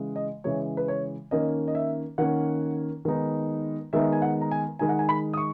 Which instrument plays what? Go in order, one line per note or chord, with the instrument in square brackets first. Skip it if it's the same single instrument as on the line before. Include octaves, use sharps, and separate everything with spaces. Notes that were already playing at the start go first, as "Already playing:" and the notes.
Already playing: [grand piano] C#3 E3 G#3
D#5
C#3 E3 G#3 C#5
B4
C#5
D#3 A#3 C#4 D#5
D#5
E5
D#3 A#3 C#4 F#5
D#3 G#3 B3 D#4
D#3 G#3 B3 D#4 E5
G#5
F#5
A#5
G#5
D#3 G#3 D#4 G#5
F#5
G#5
B5
D#6
C#6